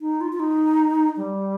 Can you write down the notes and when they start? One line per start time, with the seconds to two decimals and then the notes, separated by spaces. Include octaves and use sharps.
0.01 D#4
0.21 F4
0.33 F4
0.40 D#4
1.17 G3